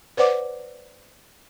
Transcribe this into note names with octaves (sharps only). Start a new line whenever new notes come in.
B4 C5 D5 F#5 D6